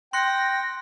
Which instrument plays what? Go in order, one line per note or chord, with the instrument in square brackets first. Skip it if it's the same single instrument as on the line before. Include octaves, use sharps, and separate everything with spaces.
[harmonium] G5 [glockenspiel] C6 F#6 C#7 [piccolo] A#6